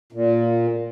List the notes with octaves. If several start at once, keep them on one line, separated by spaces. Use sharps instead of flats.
A#2